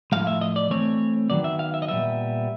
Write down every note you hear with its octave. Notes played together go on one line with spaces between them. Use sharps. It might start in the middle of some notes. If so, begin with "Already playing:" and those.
A2 F3 G#3 F5
E5
D#5
D5
E3 A3 C4 C#5
D#3 F#3 B3 D5
E5
F5
E5
D#5
A#2 G3 B3 E5